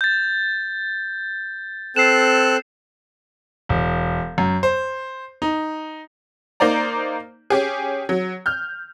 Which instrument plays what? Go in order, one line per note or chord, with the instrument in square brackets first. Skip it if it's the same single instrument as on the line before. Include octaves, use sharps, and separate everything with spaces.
[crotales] G6 A6
[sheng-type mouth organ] C4 A4 F#6 [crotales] C7 E7
[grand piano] E1
F#2
C5
D#4
[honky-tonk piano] A#3 D#4 C5 D5 A#5
C#4 G4 G#4
F#3
F6 G6